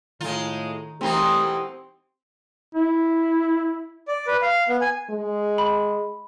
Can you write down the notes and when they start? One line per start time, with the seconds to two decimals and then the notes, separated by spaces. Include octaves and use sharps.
0.21 A2 D#3 G#3 F4
1.01 B2 E3 A3 C4 D#4 G4 A#4 C6
2.75 E4
4.08 D5
4.27 B4
4.42 F5
4.69 B3
4.82 G#5
5.10 G#3
5.58 B5